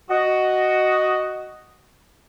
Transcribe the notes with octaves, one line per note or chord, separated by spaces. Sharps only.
F#4 D#5